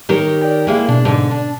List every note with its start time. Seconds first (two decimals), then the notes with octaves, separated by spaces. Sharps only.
0.09 D#3 G4 A#4 C#5
0.41 D5 G5
0.67 G#3 A#3 E4
0.89 B2 D4
1.05 G#2 D3
1.31 D4